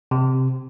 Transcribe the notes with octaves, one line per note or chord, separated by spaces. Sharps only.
C3